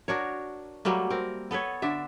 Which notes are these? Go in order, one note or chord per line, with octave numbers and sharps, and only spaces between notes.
D4 F#4 A#4 C#5
F#3 G3 A3 A#3
C4 A#4
B3 A4 B4 C#5
D3 D4 E5